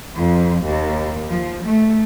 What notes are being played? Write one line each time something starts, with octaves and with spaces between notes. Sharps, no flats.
F2
D#2
F3
A3